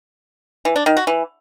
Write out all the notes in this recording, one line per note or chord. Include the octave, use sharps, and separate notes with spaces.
E3
D4
D#3
F#4
E3